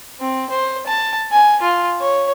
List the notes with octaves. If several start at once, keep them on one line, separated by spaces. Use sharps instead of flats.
C4
C5
A5
G#5
F4
C#5